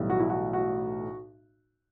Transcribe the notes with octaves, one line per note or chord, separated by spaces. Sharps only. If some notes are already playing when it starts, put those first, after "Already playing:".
Already playing: B1 A2 E3 G3
F#4
E4
F#4
F#4